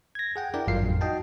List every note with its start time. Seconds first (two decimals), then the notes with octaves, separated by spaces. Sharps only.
0.15 G#6 A#6
0.36 G#4 F#5 G5
0.54 D4 E4 A#4 D5 G5
0.67 G#1 G2 F#3 F4 F5 C7
0.82 F2 A2
1.01 D#4 F#4 D#5 G5 A5